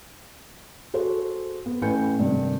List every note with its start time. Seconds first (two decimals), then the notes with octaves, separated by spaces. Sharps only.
0.94 F#4 G#4 A4 C5
1.66 B3
1.82 A1 A2 B4 G#5 G6 C#7
2.19 G2 C3 D#3